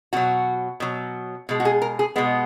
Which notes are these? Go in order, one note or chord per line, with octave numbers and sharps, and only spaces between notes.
B2 F#3 F#4
B2 F#3
B2 G#3
F#4
G#4
A#4
G#4
B2 G#3 B3